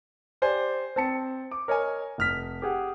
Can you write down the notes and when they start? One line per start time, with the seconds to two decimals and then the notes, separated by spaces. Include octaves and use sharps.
0.42 G4 C5 D5 G#5
0.96 C4 A5 C#7
1.51 D6
1.68 A#4 C#5 D#5 G#5
2.18 F1 F6 B6
2.62 G4 G#4 F#5